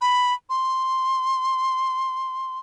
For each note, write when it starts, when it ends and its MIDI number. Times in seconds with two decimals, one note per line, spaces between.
0.01 0.34 83
0.49 2.58 84